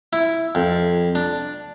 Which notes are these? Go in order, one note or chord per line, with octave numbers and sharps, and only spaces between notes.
E4
F2
D4